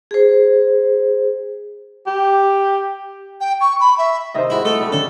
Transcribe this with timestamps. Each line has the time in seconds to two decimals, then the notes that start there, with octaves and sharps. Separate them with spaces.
0.11 G#4 C5
2.07 G4
3.40 G5
3.61 C#6
3.80 B5
3.98 E5
4.34 C3 D#3 C5 D#5 E5
4.50 E3 G#3 E4 F#4
4.65 A3 A4 D#6
4.79 A2 G3 D4
4.92 F2 D3 C#4 A4